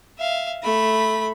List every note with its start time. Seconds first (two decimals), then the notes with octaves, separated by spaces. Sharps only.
0.19 E5 F5
0.63 A3 B5